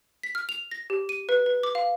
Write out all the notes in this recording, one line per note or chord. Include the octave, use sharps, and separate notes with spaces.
B6
F6
F7
A#6
G4
D#7
B4
B4
D6
F5